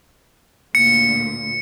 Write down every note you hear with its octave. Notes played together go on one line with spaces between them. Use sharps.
D2 A#2 C#7